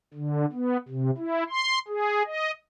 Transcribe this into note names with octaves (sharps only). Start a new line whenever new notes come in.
D3
B3
C3
E4
C6
G#4
D#5